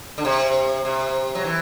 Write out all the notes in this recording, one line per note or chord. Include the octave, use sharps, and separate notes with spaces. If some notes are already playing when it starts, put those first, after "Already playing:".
D3
C3
C3
F#3
E3